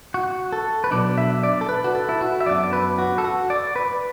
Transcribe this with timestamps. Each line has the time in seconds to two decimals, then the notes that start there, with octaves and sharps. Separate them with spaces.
0.14 F#4
0.52 A4
0.84 B4
0.91 B2 F#3 D4 D5
1.18 E5
1.43 D5
1.61 A4
1.69 B4
1.84 F#4
1.95 A4
2.09 E4
2.21 F#4
2.41 E5
2.46 F#2 F#3 B3 D4 D5
2.73 B4
2.99 F#4
3.18 A4
3.24 F#4
3.50 D5
3.76 B4